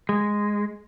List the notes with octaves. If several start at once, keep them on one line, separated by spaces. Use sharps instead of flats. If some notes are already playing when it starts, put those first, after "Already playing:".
G#3